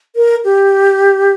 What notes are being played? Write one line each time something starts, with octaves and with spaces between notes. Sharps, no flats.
A#4
G4